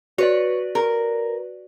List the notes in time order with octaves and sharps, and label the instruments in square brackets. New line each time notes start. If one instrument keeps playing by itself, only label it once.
[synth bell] F#4 B4 D5 [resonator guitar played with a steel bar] C#5
[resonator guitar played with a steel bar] A#4